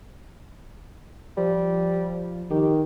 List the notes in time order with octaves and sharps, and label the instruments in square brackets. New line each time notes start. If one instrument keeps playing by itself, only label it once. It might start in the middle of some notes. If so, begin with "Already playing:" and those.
[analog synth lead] F3 [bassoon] G3
[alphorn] D#3 [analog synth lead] G4